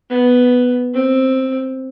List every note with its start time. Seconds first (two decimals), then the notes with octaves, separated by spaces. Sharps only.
0.10 B3
0.94 C4